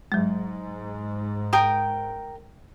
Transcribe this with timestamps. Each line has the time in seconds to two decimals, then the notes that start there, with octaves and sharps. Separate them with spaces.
0.12 G#2 F#3 G#3
1.53 A#4 G5 D#6